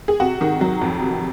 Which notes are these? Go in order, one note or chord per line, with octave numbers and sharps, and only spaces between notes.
G#4
C3 F#4
D#3
F#3
F2
C3